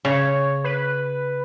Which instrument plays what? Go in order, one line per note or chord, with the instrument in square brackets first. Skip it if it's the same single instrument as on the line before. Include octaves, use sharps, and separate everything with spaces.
[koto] C#3 [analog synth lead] C#5
[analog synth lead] B4